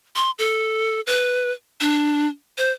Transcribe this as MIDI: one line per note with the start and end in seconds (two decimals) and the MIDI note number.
0.16 0.31 84
0.39 1.01 69
1.07 1.52 71
1.81 2.27 62
2.58 2.71 72